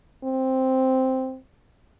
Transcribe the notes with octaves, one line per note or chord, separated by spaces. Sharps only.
C4